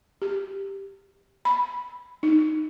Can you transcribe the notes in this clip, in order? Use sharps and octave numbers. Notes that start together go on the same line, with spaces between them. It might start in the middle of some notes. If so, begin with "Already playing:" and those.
G4
B5
D#4